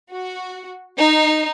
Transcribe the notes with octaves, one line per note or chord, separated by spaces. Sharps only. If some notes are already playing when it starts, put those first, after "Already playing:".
F#4
D#4